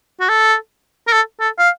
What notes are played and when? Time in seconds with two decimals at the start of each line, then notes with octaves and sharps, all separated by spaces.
0.21 F#4
0.29 A4
1.07 A#4
1.13 A4
1.40 A4
1.59 F5